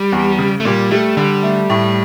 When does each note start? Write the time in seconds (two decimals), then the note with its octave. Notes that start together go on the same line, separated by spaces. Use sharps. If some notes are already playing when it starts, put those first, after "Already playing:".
Already playing: G3
0.12 E2
0.38 C#3
0.60 A3
0.65 A#2 G3
0.91 G3 A3
1.17 D3 G3
1.43 A3
1.70 A2